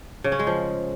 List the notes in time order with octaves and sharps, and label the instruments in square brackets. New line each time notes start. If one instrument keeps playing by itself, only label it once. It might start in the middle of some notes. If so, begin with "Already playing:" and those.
[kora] C#3
C#4
G#3
F3